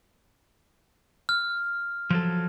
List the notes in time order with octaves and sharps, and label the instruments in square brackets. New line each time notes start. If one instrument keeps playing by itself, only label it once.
[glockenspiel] F6
[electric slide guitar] F3 F#3 A4